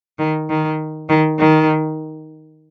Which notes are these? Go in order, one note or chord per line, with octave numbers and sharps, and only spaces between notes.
D#3
D#3
D#3
D#3